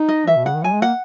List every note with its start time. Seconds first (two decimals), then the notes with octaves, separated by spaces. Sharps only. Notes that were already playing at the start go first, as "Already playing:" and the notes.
Already playing: D#4
0.09 D#5
0.27 E3 E5
0.36 B2
0.46 C#3 F#5
0.55 D#3
0.64 F#3 G#5
0.73 G#3
0.82 A#3 F#5